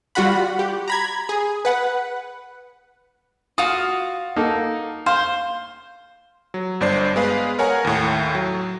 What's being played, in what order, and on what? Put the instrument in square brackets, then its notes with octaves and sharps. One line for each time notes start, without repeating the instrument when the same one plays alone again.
[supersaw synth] G3 F4 F#4 F#5 B5
G4
A#5 B5 G#6
G#4
B4 F#5
[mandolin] F4 F#4 F5 [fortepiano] D#6
[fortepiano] A#3 D#4 A4
[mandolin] C5 [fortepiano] F5 C6
[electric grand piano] F#3
G1 G2 D4 C5 D5 C7
G#3 B3 G#4 B4 F5
A#4 C#5 F#5 G#5 A#5
D#2 A2
F#3